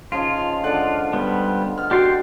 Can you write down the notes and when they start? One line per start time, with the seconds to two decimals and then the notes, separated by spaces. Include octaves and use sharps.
0.12 C#3 F3 D#4 F4
0.64 D3 G#3 D5 F#5
1.13 G3 B3 F4
1.78 B3 F6
1.91 F#4 G4 D5 C6